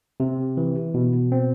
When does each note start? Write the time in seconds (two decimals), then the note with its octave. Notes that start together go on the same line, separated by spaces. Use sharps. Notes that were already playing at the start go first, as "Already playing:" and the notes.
0.20 C3
0.57 E3
0.94 B2
1.32 C4